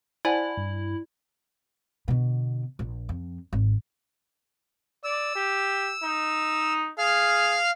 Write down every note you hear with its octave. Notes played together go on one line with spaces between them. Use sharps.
E4 C5 D5 F#5 G#5 A5 B5
G2
B2 D3
A#1
F2
G#1
D5 E6
G4
D#4
G#4 F5 F6